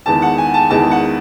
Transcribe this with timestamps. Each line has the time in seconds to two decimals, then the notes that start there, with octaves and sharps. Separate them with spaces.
0.06 E2 D#3 G#3 B3 A5
0.22 F#5
0.38 G#5
0.54 A5
0.70 E2 D#3 G#3 B3 A5
0.91 F#5